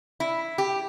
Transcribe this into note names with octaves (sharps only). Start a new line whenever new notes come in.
E4
G4